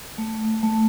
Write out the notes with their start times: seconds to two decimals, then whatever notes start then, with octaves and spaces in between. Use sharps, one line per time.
0.18 A3
0.63 A3